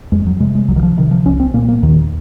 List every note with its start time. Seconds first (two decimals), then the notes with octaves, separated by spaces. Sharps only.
0.12 F2 G#3
0.27 F#3
0.40 C3 G#3
0.55 G#3
0.68 C2 F#3
0.76 D#3
0.83 F3
0.97 C3 D#3
1.11 F3
1.25 C2 C#4
1.40 C4
1.54 A#2 A#3
1.68 A#3
1.83 D#2 D#3